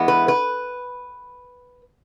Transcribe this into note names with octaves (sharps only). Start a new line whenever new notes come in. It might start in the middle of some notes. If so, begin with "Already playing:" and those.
Already playing: E3 G#3 B3 E4
B4
B4